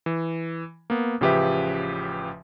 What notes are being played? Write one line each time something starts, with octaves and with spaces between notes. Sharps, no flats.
E3
A#3 B3
A1 C#3 F3 G4 B4 E5